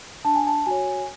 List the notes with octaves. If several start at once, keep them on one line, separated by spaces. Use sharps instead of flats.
D4 A5
G#5
A5
F#4 C#5 G#5